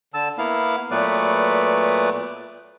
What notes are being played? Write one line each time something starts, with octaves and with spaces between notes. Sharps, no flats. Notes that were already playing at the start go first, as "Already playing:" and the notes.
D3 A5 E6
A#3 B3 E4 F5
A#2 F#3 A3 B3 B4 D5